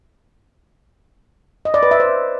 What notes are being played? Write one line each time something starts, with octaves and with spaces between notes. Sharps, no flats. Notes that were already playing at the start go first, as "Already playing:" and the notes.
D#5
D5
B4
E5
C5